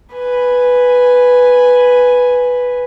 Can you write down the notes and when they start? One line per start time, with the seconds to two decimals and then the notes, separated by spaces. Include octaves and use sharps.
0.14 B4 G#5